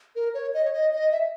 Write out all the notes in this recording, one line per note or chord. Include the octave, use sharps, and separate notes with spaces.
A#4
C#5
D#5
C#5
D#5
D#5
E5